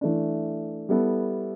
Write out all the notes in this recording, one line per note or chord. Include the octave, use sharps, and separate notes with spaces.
E3 A3 D4
G3 B3 E4 A4